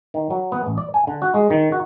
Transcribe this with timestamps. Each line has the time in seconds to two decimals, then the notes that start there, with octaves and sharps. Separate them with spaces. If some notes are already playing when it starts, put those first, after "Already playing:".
0.14 D#3
0.30 F#3
0.52 B3
0.66 A1
0.78 D5
0.94 G#5
1.07 D3
1.22 F#4
1.34 G#3
1.50 D#3
1.72 F#4